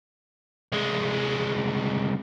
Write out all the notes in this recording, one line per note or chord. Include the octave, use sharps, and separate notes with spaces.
C2 G#3